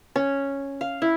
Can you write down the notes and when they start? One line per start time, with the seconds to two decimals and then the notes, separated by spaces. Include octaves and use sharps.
0.16 C#4
0.81 F5
1.02 E4